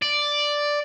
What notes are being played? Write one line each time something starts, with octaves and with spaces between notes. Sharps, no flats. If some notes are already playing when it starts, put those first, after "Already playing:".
D5